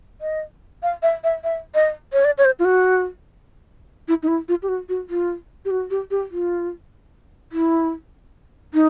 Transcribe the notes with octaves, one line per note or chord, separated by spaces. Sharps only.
D#5
F5
E5
E5
E5
D#5
C#5
D5
C#5
C5
F4
F#4
E4
D#4
E4
F4
G4
F#4
F#4
F4
G4
F#4
G4
G4
F4
E4
D#4